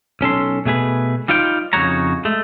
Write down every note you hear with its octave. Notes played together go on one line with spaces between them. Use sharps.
B1 C#4 A4 C6
B2 A3 G#4 B4
G3 D#4 F4 C5 G5
F2 C#3 D#4 F#4 C#5 A#5
G#3 A3